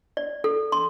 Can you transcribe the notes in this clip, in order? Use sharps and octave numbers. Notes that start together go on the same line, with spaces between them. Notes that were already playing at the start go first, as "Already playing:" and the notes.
D5
A4
C6